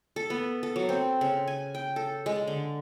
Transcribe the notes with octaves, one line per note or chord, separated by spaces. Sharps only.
A4
B3
A4
F#3
C4
C#3
G#5
G5
A4
G#3
D3